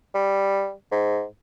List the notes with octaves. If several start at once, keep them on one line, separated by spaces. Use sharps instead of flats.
G3
G#2